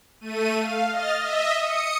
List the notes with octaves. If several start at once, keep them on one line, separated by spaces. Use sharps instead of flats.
A3 D#7
F5
D#5 F6 A6
D#5 E5
D#6 C#7